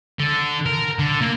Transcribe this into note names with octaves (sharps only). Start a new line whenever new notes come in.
D3
A#4
D3
A#3